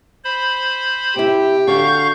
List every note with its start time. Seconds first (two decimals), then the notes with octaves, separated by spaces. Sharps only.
0.24 C5 B5
1.16 C3 E4 G4
1.67 D3 F#4 F5 C#6 G6